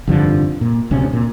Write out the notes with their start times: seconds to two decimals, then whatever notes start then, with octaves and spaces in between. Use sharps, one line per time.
0.07 F1 G2 D3 F3
0.61 A#2
0.91 D1 D2 C3 C#4
1.13 A#2